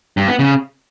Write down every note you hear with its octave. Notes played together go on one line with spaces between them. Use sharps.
G2
B3
C#3